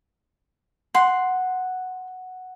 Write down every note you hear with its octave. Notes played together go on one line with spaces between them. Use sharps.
F#5 C6